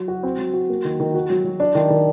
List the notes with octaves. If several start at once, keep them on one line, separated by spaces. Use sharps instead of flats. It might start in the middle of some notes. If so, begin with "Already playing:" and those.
Already playing: F#3
F#4
C4
F#3
F#4
A#3
D#3
D#3
F#4
F#3
F#3
D4
D#3
D#3